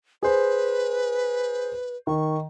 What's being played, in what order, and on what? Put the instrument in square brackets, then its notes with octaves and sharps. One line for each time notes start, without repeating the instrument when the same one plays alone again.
[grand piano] G#4 C5 [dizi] B4
[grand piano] D#3 [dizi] C#6